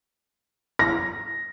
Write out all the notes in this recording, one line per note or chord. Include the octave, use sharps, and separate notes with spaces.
A#6